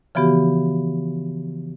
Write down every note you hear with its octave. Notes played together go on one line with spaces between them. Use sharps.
C#3 E3 F3 B3 F#4 G4